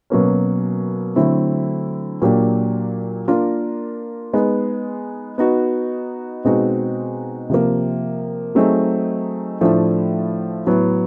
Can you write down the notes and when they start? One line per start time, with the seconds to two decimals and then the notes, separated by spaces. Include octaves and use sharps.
0.10 B2 F#3 A#3 C#4
1.16 D3 F#3 A3 C4 E4
2.22 A#2 F#3 A#3 D4 G4
3.28 A#3 D4 F4 A#4
4.33 G#3 B3 D#4
5.38 B3 D#4 F#4
6.44 B2 G#3 C4 D#4 F#4
7.50 C3 F3 A#3
8.55 F#3 A3 C4 D#4 G#4
9.61 A2 F3 A3 D4
10.66 A2 F#3 B3